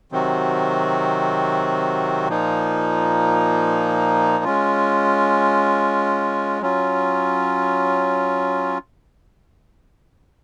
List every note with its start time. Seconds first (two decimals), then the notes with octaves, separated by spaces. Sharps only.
0.12 C3 D#3 F#3 C4 F#4
2.28 A#2 F3 A#3 D#4
4.44 G#3 C#4 F4
6.61 F#3 C#4 F4